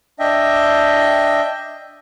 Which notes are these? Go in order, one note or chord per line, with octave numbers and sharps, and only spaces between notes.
D4 D#5 E5 G5